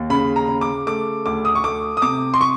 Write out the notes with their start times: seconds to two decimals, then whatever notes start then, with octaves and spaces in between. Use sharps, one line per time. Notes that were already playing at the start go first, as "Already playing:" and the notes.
Already playing: D#2
0.10 C#3 B5
0.36 A#5
0.49 C#3
0.61 D6
0.87 A3 D6
1.26 D2 D6
1.45 D#6
1.55 C#6
1.64 A3 D6
1.97 D#6
2.02 C3 D6
2.34 C6
2.41 C#6